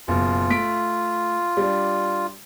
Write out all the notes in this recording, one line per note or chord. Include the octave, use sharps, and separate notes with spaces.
F#1 B2 F4
A3 B6 D7
G3 D4